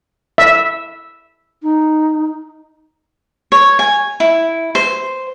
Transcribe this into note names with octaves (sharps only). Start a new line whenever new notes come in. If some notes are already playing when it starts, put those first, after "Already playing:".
E5
D#4
C#5
G#5
E4
C5